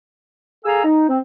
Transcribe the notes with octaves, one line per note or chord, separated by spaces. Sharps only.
G#4 A4 F5 G#5 A#5 E6
D#4
C4